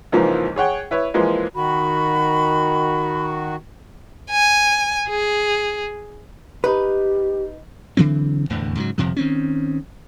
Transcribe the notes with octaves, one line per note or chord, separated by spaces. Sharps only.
C#2 G#2 E3 F3 A#3
G#4 C#5 F#5 G5
E4 B4 C#5
E3 F3 G#3 A#3
D#3 F#4 B5
G#5
G#4
D#4 G4 B4
C#3 E3 F#3 C4
F1 E2 A2 D3
G#2 C#3 F3 F#3
G1 F2 C3 F3
D#3 C4 C#4